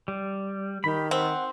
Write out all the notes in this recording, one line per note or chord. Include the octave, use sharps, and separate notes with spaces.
G3
D#3 G4 B5
C4 F#5